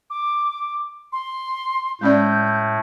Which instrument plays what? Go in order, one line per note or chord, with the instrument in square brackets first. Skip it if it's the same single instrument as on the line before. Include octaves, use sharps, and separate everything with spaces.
[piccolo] D6
C6
[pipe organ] A2 [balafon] G#3 C#4 D5 [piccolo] G6